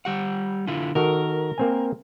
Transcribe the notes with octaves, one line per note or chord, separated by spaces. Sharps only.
G3 G4 F#5
D3 E4 F4
D#3 F#4 A4 A#4
A#3 C4 G#5